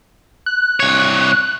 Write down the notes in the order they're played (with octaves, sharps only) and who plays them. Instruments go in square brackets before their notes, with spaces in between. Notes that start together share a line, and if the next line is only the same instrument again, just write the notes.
[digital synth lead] F#6
[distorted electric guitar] C2 C#5